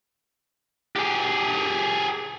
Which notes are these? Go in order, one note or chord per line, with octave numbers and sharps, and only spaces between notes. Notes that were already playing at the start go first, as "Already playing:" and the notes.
G4 G#4